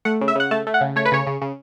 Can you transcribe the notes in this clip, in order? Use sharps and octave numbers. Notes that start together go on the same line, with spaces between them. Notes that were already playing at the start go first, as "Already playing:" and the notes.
A3 F#5
C#3
E5
C#3 F#5
A3 A5
A3
F#5
C#3
A3 C#5
B4
C#3 C#5
C#3
C#3